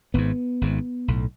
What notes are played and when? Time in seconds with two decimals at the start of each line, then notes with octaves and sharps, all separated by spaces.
0.14 G#1 G#2 B3
0.61 G#1 G#2
1.08 B1 A2